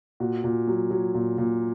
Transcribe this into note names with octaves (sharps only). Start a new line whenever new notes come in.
A#2 F#4
A#2
F#3
F#3
A#2
A#2